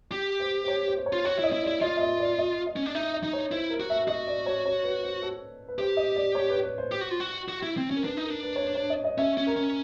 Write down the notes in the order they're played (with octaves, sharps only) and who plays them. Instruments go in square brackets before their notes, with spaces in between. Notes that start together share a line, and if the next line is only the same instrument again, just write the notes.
[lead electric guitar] G4
[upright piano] C5
C5
C#5
C5
C5
C#5
[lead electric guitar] F4
[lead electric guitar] F#4 [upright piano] C#5
[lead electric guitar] E4 [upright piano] D#5
[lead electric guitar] E4
[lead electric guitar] E4 [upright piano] D5
[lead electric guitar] F4 [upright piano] D#5
[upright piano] E5
D#5
D5
D#5
D#5
[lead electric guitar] C#4
D4
[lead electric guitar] D#4 [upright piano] E5
[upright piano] D#5
[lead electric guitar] D#4
[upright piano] C#5
[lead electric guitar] E4 [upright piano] C5
[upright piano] A#4
[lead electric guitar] F#4
[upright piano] E5
[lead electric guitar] F#4 [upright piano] D#5
[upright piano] D5
C#5
C#5
B4
C5
A4
B4
[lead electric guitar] G4 [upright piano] C5
[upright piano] D#5
D5
C#5
B4
B4
C5
[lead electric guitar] G4
F#4
F4
F#4
F#4
E4
C4
C#4
[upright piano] A#4
[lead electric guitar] D4 [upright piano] B4
[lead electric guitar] D#4
[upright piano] A#4
[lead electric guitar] D4
[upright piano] B4
C#5
C5
C#5
D#5
D#5
[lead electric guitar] C#4 [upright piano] E5
[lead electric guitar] C#4
[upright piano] A#4
[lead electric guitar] C#4